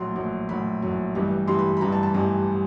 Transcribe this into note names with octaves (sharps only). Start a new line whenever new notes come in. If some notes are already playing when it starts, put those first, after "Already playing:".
Already playing: A#1 A2 F#3 C6
A#1 A2 F#3
A#1 A2 F#3 B5
A#1 A2 F#3
A1 G2 E3 G3
A1 G2 E3 G3 C6
B5
B5
A1 G2 E3 G3 A#5
A5
A5
A1 G2 E3 G3 G#5